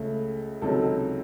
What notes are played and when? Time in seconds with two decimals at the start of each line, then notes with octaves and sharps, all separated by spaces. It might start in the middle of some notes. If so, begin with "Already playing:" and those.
Already playing: C#2 C#3 A3
0.62 C#2 C3 D#3 F#3 A4